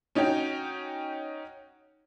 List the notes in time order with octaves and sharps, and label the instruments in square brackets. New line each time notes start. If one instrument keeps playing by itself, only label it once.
[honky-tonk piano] C#4 D#4 F#4 C#5 G5